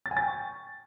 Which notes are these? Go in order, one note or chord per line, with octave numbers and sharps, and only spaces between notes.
A6
G#5
A6
G5
C#6